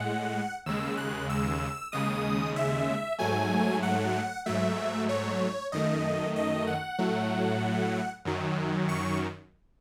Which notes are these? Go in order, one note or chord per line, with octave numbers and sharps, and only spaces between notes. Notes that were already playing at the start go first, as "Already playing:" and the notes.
Already playing: A2 G#3 F#5
D#2 C#3 G#3 E6
F#6
E6
D#2 C#3 G#3 D#6
E5
G#2 F#3 A3 G#5
F#5
G#2 F#3 A3 E5
C#5
F#2 D#3 A3 D#5
D#5
F#5
A2 F#3 A3
F#2 D#3 F#3
C#6